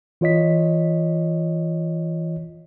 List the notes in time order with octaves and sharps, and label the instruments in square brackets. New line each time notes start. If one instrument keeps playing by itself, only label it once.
[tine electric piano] E3 F4 C#5 D#5 B6